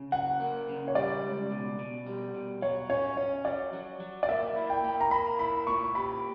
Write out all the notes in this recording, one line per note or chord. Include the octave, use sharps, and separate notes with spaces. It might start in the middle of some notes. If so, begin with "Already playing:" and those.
Already playing: C#3
F#3 F#5
A#3
C#3
C#5
G3 D5
C#2
B2
B2
G3
B2
F#3 C#5
C#4 C#5
C#4 C#5
F#3 D5
F#3
F#3
D5
A#3 E5
E4
G5
A#3
A#5
A#3 B5
E4 B5
A#2 C#6
G4 B5